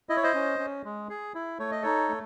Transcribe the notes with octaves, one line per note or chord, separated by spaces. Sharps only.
E4 D#5
C#5
C5 D#5
C#4
C#4
G#3
G#4
E4
A3 C#5
D#5
D#4 A4 C#5
A3